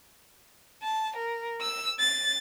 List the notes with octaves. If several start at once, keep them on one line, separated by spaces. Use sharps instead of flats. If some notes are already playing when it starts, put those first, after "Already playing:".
A5
A#4
E6
A6